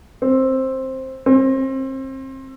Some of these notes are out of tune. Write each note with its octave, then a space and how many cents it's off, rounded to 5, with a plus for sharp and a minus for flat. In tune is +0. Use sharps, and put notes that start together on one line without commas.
C4 +10
C4 +30